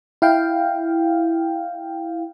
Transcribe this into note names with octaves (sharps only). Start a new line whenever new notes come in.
E4 F5 G5